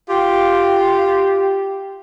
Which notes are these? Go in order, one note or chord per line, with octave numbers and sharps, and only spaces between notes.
F4 G4